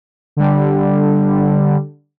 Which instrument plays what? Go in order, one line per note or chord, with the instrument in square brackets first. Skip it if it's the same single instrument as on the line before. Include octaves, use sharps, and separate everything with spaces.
[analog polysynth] D3 G3